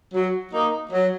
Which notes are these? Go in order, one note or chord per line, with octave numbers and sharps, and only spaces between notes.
F#3
A#3 D#4
F#3